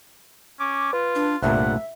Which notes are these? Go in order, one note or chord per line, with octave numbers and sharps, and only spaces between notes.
C#4 D6
F4 B4
D4
C2 G2 A#2 A3 E5 F#5